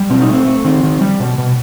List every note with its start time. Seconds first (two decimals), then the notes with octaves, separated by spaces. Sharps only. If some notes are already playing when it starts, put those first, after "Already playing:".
Already playing: G3
0.10 B2 C4
0.22 D#4
0.29 A3 C4
0.46 A3
0.65 D#3 C4
0.83 D#3
1.01 G3
1.20 B2
1.38 B2